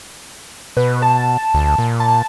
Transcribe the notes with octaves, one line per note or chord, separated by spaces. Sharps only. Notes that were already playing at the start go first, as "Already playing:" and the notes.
B2 B4
A5
D2
A#2
A5